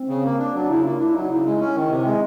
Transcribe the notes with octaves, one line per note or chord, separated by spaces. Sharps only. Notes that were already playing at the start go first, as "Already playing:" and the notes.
Already playing: C4
C#3
A#3
D4
F#3 D4
C#3 E4
A#3 F4
D4 E4
F#3 D#4
C#3 E4
G#3
C#4
D#3
C3
G#3